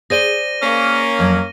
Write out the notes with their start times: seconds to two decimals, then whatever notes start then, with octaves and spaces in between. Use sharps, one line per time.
0.10 G#4 C5 D5 A#6 D#7 G7
0.61 A#3 C#4
1.19 F2 F#3